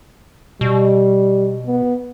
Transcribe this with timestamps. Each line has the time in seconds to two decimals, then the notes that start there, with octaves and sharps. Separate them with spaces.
0.61 B2 G3
1.67 B3